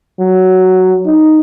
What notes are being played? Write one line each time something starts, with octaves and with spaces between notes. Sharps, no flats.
F#3
D#4